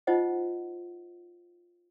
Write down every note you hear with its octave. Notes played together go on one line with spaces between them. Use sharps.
D#4 F4 C5 D#5 F#5